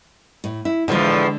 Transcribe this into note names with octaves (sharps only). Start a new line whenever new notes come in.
A2
E4
E2 A2 D3 F3 G#3